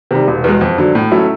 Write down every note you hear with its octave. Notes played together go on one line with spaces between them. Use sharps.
C3 D#3 G3
E1
E2 B2 G#3
F2
D3 F#3
A2
F#3 A3 C#4 E4